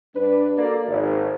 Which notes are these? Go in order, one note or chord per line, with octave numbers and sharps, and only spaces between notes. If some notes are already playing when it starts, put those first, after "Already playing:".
G2 D4 B4
A#3 F#4 A4 A#4 D5
G#1